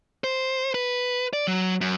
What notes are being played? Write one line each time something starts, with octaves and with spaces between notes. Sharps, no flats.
C5
B4
D5
F#3
F#2